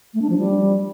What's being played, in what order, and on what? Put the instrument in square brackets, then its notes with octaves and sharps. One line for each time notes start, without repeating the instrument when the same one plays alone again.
[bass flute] A3
D4
F3
G3